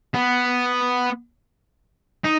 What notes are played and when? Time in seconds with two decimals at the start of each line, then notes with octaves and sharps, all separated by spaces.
0.14 B3
2.24 D#4